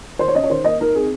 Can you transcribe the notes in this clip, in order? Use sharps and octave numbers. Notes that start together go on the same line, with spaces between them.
D#3 C5
C#5
C#4 D#5
C#5
D#3 C5
A#3 D#5
D#4 A#4
C4 G#4